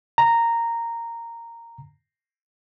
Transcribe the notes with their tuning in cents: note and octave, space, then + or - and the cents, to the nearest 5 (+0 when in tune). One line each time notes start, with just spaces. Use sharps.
A#5 -10